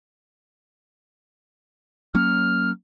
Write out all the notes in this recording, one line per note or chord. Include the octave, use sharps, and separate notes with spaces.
F#3 A#3 C#4 F6